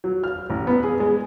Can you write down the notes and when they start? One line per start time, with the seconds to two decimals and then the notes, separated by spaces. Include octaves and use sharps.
0.04 F#3
0.24 F6
0.50 A1
0.67 B3
0.84 G#4
1.00 G#3